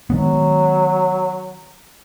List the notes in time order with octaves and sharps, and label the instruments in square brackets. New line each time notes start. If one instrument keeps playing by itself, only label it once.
[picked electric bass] D#3 G#3 B3 [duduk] F#3